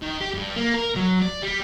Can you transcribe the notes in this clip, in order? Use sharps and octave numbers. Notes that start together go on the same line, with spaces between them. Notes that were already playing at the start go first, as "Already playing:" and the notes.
D#3
G4
G2
A#3
A#4
F#3
D5
G3